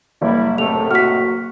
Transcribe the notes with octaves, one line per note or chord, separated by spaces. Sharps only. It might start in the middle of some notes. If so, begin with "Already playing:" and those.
F#1 G3 E4
A2 C3 A3 F7
F#4 F6 B6